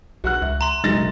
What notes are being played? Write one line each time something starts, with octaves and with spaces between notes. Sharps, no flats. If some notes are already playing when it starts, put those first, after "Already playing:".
B1 F#4 F#5 F#6
C#2 E5
A#5 C6
F#1 B1 F#3 G#3 D#4 A6 A#6